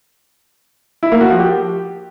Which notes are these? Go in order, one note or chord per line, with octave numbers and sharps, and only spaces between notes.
E4
A#3
F#4
F3
G4